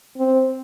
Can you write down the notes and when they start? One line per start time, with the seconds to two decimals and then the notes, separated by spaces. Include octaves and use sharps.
0.17 C4